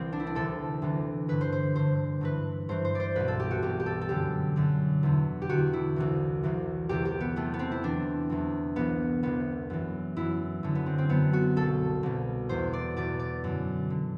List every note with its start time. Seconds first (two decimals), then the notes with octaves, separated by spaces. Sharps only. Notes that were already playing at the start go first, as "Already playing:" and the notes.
Already playing: C2 C3 E3 C4
0.13 D4
0.20 E4
0.27 D4
0.35 D2 C3 E3 A4
0.82 D2 C3 E3
1.28 G2 D3 B4
1.41 C5
1.52 C5
1.76 G2 D3 C5
2.21 G2 E3 B4
2.69 G2 E3 C5
2.85 C5
2.95 C5 D5
3.16 C2 B2 B4
3.28 A4
3.40 G4
3.51 F#4
3.62 C2 B2 G4
3.80 G4
3.86 A4
4.01 A4
4.09 F#2 D3 G4
4.56 F#2 D3
5.03 E2 D3
5.42 G4
5.49 E2 D3 F#4
5.73 E4
5.96 C2 C3 E3
6.43 C2 C3 E3
6.89 E2 C3 E3 G4
7.05 G4
7.21 B3
7.36 E2 C3 E3 A3
7.54 B3
7.59 C4
7.71 E4
7.83 E2 C3 E3 D4
8.30 E2 C3 E3
8.76 C2 C3 E3 B3
9.23 C2 C3 E3 B3
9.70 F#2 E3
10.16 F#2 E3 E4
10.63 F#2 D3
10.75 B3
10.86 C4
10.98 C4
11.09 F#2 D3 B3
11.33 F#4
11.56 C2 B2 A4
12.03 C2 B2
12.49 E2 B2 C5
12.73 D5
12.96 E2 B2 D5
13.19 D5
13.44 F#2 D3
13.90 D3